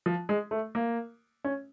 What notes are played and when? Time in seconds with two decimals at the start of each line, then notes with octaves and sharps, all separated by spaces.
0.06 F3
0.29 G#3
0.51 A3
0.75 A#3
1.44 C#4